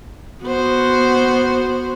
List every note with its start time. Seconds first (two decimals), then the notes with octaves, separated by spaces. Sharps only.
0.44 B3 F#4 C5